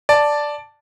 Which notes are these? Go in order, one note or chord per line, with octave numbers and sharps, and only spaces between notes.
D5 A5